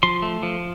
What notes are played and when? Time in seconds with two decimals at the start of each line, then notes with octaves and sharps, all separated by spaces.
0.03 F3 C6
0.22 A3
0.43 F3